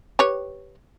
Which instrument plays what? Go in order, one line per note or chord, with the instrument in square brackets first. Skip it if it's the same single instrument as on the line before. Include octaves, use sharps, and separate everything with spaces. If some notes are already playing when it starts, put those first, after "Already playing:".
[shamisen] G4 B4 C#5